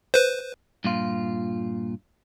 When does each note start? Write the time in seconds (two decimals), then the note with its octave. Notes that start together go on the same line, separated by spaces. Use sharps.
0.14 B4 C5
0.84 G2 A#2 F4